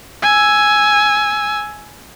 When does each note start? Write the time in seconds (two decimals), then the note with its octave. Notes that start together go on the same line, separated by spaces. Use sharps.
0.23 G#5 E6